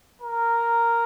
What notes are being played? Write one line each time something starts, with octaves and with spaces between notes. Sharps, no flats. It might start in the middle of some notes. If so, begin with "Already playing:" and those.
A#4